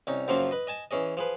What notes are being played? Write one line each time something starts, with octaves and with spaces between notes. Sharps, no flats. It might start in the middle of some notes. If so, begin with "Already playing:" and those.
C2 C#4 D#4
F#2 C#3 F3 A#3 C4 F4
B4 D#5
D#5 G#5 A5
E3 C#4 G#4 D#5
F3 G#4 B4